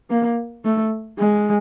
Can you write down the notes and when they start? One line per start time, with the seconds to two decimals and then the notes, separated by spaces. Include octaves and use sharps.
0.10 A#3
0.65 A3
1.19 G#3